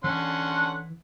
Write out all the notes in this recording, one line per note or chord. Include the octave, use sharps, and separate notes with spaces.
D3 E3 C#4 F#5 C6